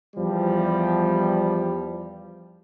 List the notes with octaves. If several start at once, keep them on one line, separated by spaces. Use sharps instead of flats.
E2 F3 G3